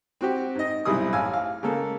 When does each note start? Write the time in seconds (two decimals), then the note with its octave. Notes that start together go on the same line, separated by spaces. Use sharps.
0.21 C4 F#4 G4
0.55 G#2 D#5
0.85 B1 C3 G3 E4 G#4 D#6
1.13 A1 F5 G#5 E6
1.33 F5
1.63 C#3 G#3 A#3 A4